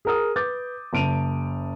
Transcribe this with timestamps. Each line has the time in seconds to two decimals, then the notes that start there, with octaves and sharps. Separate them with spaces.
0.05 G#4 A#4 D#6
0.36 B4 D6 G6 A6
0.93 F#1 A5 D7 D#7 F7